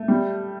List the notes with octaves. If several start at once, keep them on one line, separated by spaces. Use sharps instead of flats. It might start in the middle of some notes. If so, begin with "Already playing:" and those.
Already playing: A3
G3